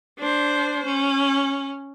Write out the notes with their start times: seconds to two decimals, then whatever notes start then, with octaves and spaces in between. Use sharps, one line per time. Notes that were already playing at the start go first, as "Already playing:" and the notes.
0.19 D4 C5
0.85 C#4